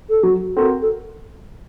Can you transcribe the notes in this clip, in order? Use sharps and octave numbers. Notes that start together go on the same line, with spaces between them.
A4
F#3 F#4
C4 F#4 A4 A#4
A4